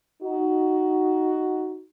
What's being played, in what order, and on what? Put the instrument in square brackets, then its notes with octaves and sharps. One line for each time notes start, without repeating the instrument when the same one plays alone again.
[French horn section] D#4 F#4